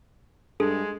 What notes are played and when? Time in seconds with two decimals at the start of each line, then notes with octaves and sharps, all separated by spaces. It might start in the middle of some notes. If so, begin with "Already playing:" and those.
0.60 G2 G#3 G#4 A4